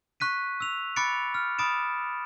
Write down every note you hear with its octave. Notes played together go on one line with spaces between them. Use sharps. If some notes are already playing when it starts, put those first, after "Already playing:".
C#6 F#6 B6 D#7
E6 F7
B5 D6 F#6 A6 C#7 D7
F6
B5 D#6 A6 D7 E7